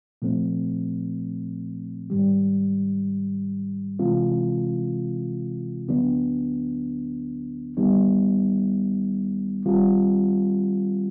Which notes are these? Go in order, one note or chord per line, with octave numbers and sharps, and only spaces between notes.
A#2 F3 A3 C4
G#2 D#3 G3
C3 E3 G#3 C4 F4
D2 D3 F#3 B3 D4
D#2 D#3 G3 B3 D#4
D#3 G3 C4 F4